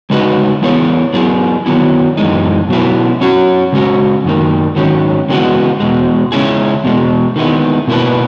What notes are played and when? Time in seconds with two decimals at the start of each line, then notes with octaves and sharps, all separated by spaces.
0.10 C#3 G#3 D#4 F#4 B4
0.62 E3 B3 E4 G#4 C#5
1.14 F#3 B3 E4 G#4
1.66 D#3 F#3 B3 E4
2.17 F#2 E3 G#3 D#4
2.69 B2 F#3 B3 E4
3.21 F#3 C#4 F#4 C#5
3.73 C#3 G#3 C#4 F#4
4.24 F#2 D#3 A#3
4.76 G#2 D#3 F#3 C#4
5.29 C#3 E3 G#3 B3 F#4
5.80 E2 B2 G#3
6.32 C#3 G#3 C#4 E4 G#4
6.84 E2 B2 G#3
7.36 D#3 G#3 B3 E4
7.88 B2 A#3 E4 B4